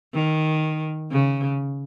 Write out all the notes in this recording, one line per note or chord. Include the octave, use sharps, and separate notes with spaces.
D#3
C#3